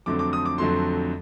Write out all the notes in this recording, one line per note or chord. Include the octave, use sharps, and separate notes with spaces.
F2 D3 F#3 A3 C4 D6
D6
D#6
D6
F2 D3 F#3 A3 C4 C6